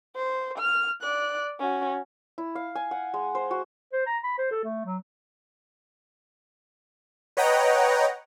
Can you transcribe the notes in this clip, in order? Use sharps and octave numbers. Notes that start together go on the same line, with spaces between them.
C5
F6
D5 F#6
C#4 F#4
E4
F5
G#5
F#5
G#3
C5
F#4
C5
A#5
B5
C5
A4
A3
F#3
B4 C#5 D#5 F#5 G5 A#5